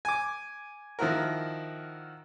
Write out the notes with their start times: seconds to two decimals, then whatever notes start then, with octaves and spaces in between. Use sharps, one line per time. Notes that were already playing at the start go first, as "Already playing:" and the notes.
0.05 G#5 D6
0.99 D#3 F3 E4 F#4 A#4